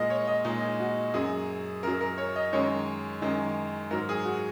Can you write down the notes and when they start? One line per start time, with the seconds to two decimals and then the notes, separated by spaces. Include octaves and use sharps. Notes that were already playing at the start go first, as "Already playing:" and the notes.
Already playing: A#2 G#3 A#4 D#5
0.10 C#5
0.27 D#5
0.44 A#2 G#3 D#4
0.80 F#4
1.14 F#2 F#3 G#4
1.83 F#2 F#3 A#4
2.01 A#4
2.18 C#5
2.36 D#5
2.53 F#2 D#3 G#3 C#5
3.22 F#2 D#3 G#3
3.91 G#2 F#3 A#4
4.09 G#4
4.25 F#4